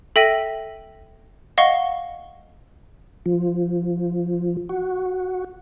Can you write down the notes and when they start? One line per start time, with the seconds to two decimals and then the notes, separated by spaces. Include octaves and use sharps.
0.16 A4 E5 G5 A#6 B6 D#7
1.58 D#5 F5 F#5 C#6 G7
3.26 F3
4.69 F#4